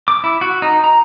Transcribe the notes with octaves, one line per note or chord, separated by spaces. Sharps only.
D6
E4
F#4
D#4
A#5